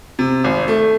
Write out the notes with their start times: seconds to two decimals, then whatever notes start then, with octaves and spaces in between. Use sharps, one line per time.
0.19 C3
0.44 G#1
0.68 A3